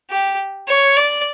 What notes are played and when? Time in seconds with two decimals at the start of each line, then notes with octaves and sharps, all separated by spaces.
0.10 G4
0.68 C#5
0.97 D5